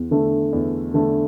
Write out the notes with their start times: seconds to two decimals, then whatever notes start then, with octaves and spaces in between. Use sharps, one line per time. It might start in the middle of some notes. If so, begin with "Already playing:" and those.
Already playing: E2
0.11 D3 A3
0.53 E2
0.94 D3 A3